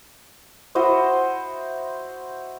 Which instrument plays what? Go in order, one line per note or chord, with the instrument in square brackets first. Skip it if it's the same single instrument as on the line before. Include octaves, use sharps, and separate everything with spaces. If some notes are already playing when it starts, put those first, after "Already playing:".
[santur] E4 F#4 C5 D#5